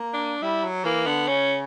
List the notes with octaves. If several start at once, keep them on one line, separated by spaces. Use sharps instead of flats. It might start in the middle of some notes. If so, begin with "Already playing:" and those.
Already playing: A#3
D4
G3 E4
F#3
E3 A#3
D3 B3
C#3 C#4